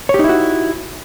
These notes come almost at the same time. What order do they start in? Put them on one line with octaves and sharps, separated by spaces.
C#5 G4 D#4 E4 F#4